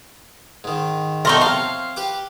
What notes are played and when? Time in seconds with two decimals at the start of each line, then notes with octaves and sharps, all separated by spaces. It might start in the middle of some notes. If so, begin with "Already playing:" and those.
0.64 G#2 D#3
1.25 G3 B3 D#4 A4 A#4 E5 C6 C#6
1.41 C4 C#5 F5
1.96 G4 B4 D6